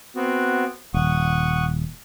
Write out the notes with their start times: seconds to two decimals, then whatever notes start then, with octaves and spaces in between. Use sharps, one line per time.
0.16 B3 C4 F#4
0.94 D#1 F#5 C#6 D#6